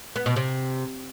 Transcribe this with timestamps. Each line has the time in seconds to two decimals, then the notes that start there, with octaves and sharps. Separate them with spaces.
0.16 B3
0.26 B2
0.36 C3